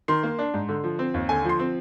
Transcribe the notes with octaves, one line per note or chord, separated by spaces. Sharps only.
D#3 C6
A#3
D4
G#2
D3
F3
C4
D#2
D3 G#5
F3 C6
C4